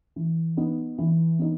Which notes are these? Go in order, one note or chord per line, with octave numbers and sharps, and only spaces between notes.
E3
B3 D#4
E3
B3 D#4